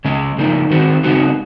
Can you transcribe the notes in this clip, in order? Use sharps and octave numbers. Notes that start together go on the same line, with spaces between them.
C#3 G#3 C#4
C#3 F3 A#3 D#4
D#3 G#3 C4 F#4
C#3 G#3 C4 D#4 F#4